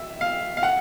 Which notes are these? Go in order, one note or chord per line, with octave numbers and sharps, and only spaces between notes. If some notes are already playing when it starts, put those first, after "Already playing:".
Already playing: E5
F5
F5
F#5